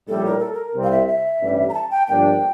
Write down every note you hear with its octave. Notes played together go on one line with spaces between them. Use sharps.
A#1 A2 G3 A4
A#4
A4
A#4
C2 C3 G3 C4
F5
E5
E5
A1 G2 E3 G3
A#5
A5
G5
G1 G2 F3 A#3 D4 G5